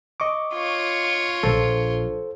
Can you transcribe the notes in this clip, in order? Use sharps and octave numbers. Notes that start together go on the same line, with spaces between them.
D#5 C#6 D6
F4 C#5
A#1 A4 C5